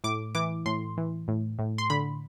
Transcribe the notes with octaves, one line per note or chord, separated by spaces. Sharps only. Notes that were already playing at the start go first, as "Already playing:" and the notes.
A2 D6
E3 D6
A2 C6
E3
A2
A2
C6
D3 B5